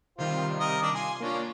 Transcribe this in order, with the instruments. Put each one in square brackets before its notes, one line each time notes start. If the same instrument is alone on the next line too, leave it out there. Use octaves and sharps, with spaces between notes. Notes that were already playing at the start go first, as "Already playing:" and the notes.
[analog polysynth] C3 D#3 G3 [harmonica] F4 C5
[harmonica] A#4 D#5
D4 D5
[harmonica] F4 G#5 [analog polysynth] C6
[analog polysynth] A#3 D4 F4 [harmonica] C#4